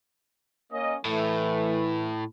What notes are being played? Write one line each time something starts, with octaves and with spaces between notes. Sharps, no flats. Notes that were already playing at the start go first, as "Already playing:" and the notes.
A#3 C#4 D#5
A2 E3 A3